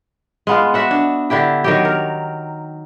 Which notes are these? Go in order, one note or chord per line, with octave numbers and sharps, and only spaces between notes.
G#3 B3 F4
F#4 E5 F#5
D4
D3 D4 E4 G4
D#3 F#3 G4
A#4